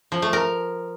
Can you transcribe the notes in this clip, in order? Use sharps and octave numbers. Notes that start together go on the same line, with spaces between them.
F3
A3
A#4